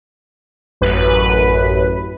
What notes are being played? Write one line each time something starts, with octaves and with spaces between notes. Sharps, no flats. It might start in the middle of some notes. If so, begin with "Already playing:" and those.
A1 F#2 B4